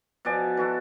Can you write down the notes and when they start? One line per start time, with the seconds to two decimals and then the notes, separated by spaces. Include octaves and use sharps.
0.25 B2 F3 D5 G#5
0.57 E3 F#4 A4